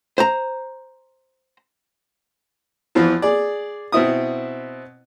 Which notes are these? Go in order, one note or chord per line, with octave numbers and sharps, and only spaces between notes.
C5 A#5
E2 E3 F3 F4
G#4 D5
B2 C4 E4 D#6